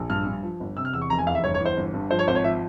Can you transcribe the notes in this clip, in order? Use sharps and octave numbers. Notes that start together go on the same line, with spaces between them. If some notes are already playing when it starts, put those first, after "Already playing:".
Already playing: A#1
G2 F6
G2
F3
G1
C3 E6
F6
E2 E6
C#6
F1 A#5
G#5
E2 F5
E5
G1 C#5
C#5
E3
C5
G1
G2
F3 C5
C#5
G#1 C5
C#5
F3 E5